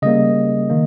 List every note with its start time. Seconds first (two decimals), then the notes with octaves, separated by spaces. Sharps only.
0.02 C#3 G3 A#3 D#5
0.70 D#3 A#3